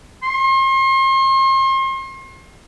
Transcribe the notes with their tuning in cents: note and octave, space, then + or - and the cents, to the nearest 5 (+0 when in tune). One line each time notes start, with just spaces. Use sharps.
C6 +40